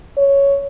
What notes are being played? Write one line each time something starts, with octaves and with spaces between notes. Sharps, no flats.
C#5